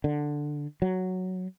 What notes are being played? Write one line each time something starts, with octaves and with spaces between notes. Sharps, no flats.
D3
F#3